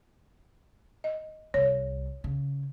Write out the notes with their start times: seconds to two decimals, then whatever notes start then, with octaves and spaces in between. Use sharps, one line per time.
1.04 D#5
1.54 C2 C#5
2.24 C#3